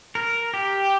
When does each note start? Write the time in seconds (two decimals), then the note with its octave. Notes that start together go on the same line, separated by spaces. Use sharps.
0.15 A#4
0.54 G4